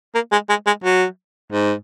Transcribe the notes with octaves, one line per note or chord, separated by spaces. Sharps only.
A#3
G#3
G#3
G#3
F#3
G#2